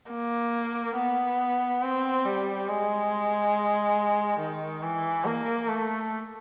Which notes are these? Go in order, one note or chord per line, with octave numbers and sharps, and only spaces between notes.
A#3
B3
C4
G3
G#3
D#3
E3
A#3
A3